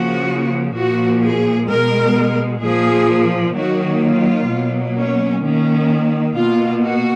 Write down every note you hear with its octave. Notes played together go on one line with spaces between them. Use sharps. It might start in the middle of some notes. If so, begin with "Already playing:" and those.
Already playing: C#3 F3 A#3 F#4
A#2 F3 A#3 F#4
G#4
B2 G#3 A#4
A#2 F3 A#3 G#4
D#3 F#3 A#3 F#4
F4
B2 F#3 A#3
C#4
D#3 A#3 C#4
B2 A#3 F4
F#4